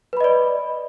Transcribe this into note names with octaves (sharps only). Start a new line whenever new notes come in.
B4 D5 D#5 B5